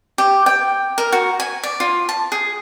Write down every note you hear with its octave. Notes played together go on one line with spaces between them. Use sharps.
G4
G5
A#4
F#4
G#5
D5
F4
A5
G#4